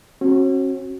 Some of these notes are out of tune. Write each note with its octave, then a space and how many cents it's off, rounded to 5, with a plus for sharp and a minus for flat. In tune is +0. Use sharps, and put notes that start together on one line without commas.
C#4 -40 F#4 +0